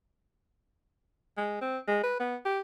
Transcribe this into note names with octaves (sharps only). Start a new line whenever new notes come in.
G#3
C4
G#3
B4
B3
G4